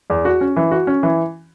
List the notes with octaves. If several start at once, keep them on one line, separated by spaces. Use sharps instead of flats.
E2
F#4
C#4
E3
F#4
C#4
E3